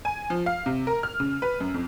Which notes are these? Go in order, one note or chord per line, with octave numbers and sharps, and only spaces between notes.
G#5
F3
F5
C3
A#4
F6
C#3
B4
F#2
F2